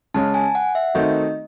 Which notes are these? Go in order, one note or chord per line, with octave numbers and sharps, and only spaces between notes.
C#3 G#3 C#4 G#4 A5
G#5
F#5
E5
D#3 A3 C4 D#4 F#4 D#5